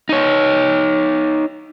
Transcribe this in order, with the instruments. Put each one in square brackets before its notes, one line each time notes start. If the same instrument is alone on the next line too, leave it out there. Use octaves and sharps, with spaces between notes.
[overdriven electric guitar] D#4 C#5